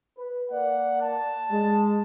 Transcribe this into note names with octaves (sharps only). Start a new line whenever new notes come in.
B4
A#3 D5 F#5
A5
G#3